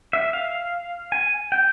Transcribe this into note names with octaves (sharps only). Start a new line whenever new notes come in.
E5
F5
G#5
G5